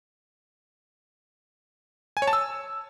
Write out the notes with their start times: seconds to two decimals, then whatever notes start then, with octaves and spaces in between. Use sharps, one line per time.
2.17 G#5
2.22 C#5
2.27 A5
2.33 E6